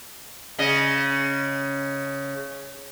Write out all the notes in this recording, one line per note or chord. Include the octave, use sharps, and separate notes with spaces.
C#3 D#5